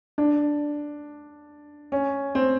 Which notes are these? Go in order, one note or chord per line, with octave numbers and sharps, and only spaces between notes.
D4
C#4
C4